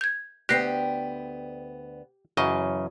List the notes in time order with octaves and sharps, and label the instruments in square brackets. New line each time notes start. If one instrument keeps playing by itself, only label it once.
[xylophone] G6 G#6
[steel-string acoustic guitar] D2 B3 G5 [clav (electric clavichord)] G4 [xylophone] F#6 A#6 C7
[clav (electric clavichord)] F#2 C#3 D#5 [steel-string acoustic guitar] E3 F#3